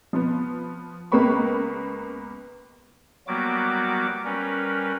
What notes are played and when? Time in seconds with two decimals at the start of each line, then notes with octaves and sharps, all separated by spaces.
0.13 F3 B3
1.12 C#2 A#3 B3 B4 B5 C#6
3.27 F#3 G3 A#3 B3 F#4 D6
4.25 G3 C#4 A#4 B4